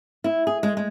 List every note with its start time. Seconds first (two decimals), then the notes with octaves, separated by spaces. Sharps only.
0.24 E4
0.47 G#4
0.63 G#3
0.77 G#3